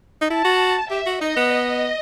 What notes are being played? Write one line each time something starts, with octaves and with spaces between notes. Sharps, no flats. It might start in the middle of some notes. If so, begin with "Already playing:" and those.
D#4
E4 A5
F#4
G4 E5
F#4
D#4 D#5
B3
D#5